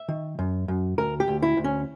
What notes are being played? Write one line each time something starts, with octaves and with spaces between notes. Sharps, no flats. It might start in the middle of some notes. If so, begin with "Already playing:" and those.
Already playing: E5
D#3
F#2
F#2
D2 A#4
G4
D2
E4
D2
C#4